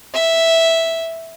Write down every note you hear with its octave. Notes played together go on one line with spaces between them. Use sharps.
E5